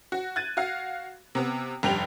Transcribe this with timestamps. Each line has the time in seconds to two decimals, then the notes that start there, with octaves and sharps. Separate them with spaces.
0.12 F#4
0.36 F#6 G#6 A6 D#7
0.57 F#4 F5
1.35 C3 B3
1.83 F1 G2 G4 G5 F7